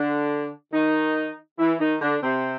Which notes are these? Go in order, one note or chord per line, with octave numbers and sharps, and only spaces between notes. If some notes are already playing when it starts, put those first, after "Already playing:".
Already playing: D3 D4
D#3 D#4
E3 E4
D#3 D#4
D3 D4
C3 C4